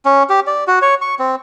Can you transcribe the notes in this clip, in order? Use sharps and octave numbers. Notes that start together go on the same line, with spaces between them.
C#4
G4
D5
F#4
C#5
C#6
C4